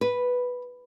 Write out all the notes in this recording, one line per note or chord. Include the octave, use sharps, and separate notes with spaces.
B4